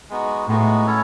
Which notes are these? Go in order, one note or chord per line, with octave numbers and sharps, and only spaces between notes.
G#3 B3 D#4 F#4
A2 G#3 B3 D#4 F#4
C#4 E4 A4 C#5